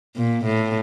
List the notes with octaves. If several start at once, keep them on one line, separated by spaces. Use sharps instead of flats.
A#2
A2